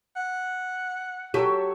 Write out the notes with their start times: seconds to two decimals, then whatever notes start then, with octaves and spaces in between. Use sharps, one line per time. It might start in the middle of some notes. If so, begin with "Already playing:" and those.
0.16 F#5
1.34 F#3 G4 A4 C#5